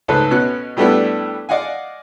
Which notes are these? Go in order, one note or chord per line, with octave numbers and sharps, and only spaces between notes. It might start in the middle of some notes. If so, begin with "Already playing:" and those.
C#2 G#2 A3 A4 B4 C5
B2 B3 C#4 F#6
A2 G3 A3 B3 D4 E4
D5 D#5 F5 F#5 G#5